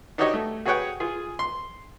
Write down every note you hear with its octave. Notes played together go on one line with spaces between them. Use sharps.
D4 D#4 F#4 G4 C#5 D#5
A3
F#4 G#4 B4 C#5 F#5 G5
F4 G#4
C6